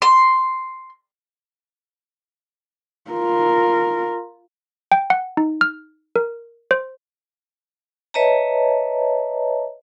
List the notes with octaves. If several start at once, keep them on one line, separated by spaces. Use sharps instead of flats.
C6
F4 A#4
G5
F#5
D#4
F6
A#4
C5
B4 C#5 D#5 E5 A5 A#5